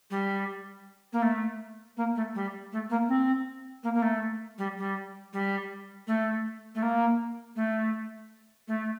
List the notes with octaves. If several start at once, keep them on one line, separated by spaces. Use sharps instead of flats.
G3
A#3
A3
A#3
A3
G3
A3
A#3
C4
A#3
A#3
A3
G3
G3
G3
A3
A3
A#3
A3
A3